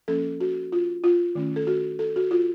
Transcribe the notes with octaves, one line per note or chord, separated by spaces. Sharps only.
F3 A#3 C#4 A4
F#4
F4
F4
D#3 A3 C#4
A4
F#4
A4
F#4
F4